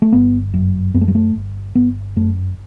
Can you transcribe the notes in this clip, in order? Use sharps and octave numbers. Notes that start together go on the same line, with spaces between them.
A3
G1 B3
F#2
F#2 B3
A3
G3
A3
G1
G1 B3
F#2 A3